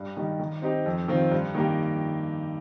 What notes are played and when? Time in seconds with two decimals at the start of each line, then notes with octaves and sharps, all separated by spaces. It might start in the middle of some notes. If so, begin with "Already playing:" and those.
Already playing: G2
0.17 D#3 G3 D#4
0.39 D#3
0.62 C4 D#4 G4
0.86 F2
1.08 D#3 C4 F4
1.31 G2
1.55 D#3 A#3 G4